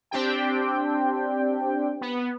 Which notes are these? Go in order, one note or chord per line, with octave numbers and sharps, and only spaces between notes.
C4 D4 G4 G5
B3